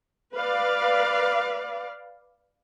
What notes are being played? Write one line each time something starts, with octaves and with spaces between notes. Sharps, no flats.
B4 D5 F5